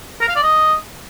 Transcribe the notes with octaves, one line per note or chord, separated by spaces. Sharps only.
A#4
F5
D5
D#5